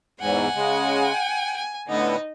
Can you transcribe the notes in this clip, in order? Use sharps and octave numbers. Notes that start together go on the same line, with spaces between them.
E2 G#2 F#5 G#5
C#3 G#3
G5
G#5
A2 D3 B3 D#4 D#5